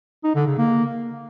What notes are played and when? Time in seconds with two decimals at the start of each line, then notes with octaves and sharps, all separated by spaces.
0.24 D#4
0.35 D3
0.47 C#3
0.58 A#3